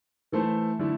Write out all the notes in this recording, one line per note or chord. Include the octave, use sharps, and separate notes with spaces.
E3 A3 E4 A4 C5
D3 A3 E4